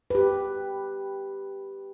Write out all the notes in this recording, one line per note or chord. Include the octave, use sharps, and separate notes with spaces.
G4 B4